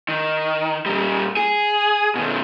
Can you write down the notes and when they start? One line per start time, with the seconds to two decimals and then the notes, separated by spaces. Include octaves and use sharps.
0.09 D#3
0.86 A#2 G3
1.37 G#4
2.15 B2 D#3